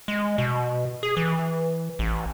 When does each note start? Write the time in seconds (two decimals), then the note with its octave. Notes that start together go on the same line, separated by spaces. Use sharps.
0.08 G#3
0.38 B2
1.03 G#4
1.17 E3
1.99 A1